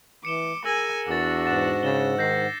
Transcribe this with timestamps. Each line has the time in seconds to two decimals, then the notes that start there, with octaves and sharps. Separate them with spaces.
0.25 E3 D6 C#7 E7 G7
0.65 G#4 A#4 G#5 E6 A#6
1.08 E2 D4 F#4 D6 A6
1.45 G#2 F#5 A6 E7
1.83 C#3 A6 E7 G7
2.18 D#3 G6 A#6 C7